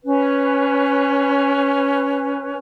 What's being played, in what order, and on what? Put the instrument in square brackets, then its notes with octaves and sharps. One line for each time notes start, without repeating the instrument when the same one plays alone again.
[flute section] C#4 B4